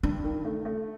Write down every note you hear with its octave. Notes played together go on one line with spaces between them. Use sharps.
G2 D4
D#3
A3
A3